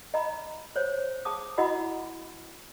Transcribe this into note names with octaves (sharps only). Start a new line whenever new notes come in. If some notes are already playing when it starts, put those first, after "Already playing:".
D#5 A#5 B5
C5 C#5
G#4 A5 D6 D#6
E4 F#4 D#5 F#5 B5